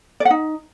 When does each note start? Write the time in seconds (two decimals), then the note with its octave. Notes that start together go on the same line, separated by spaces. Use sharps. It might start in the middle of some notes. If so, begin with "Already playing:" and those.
0.20 D5
0.25 F#5
0.30 D#4